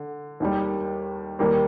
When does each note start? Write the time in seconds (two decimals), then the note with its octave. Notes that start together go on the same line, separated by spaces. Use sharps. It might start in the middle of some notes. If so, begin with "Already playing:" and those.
Already playing: D3
0.40 D#2 D#3 G3
1.39 D#2 D#3 G3 A#3